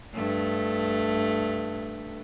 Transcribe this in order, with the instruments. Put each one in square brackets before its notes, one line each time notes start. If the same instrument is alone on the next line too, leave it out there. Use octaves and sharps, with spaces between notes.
[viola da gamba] G2 A3